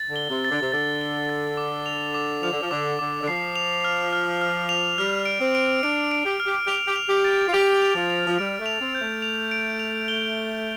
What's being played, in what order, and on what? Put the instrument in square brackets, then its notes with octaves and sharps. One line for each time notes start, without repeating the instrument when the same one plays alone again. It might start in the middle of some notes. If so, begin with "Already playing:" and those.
Already playing: [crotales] A6
[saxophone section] D3
[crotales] G7
[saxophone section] C3
[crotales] A6
[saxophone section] D3
C3
[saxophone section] D3 [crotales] A6
[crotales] G7
A6
D6
F7
D6
[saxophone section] F3 [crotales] F7
[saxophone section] D3
F3
[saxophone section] D3 [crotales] D6
[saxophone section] D3 [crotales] D6
[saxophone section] D3
[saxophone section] F3 [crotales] C7
[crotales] F7
F6
F6
F6
F7
[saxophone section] G3 [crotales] F6
[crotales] D7
[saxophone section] C4
[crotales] D7
[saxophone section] D4 [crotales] D7
[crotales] D7
[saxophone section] G4
[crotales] F6
[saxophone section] G4
[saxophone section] G4 [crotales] F7
[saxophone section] G4
[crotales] F7
[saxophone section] G4
[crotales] A6
[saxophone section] F4
[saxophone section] G4 [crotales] F7
[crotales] F7
[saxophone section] F3
[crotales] F7
[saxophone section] F3
[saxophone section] G3 [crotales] D7
[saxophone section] A3
[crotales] F7
[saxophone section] C4
[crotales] G6
[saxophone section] A3
[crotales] F7
D7
F7
G7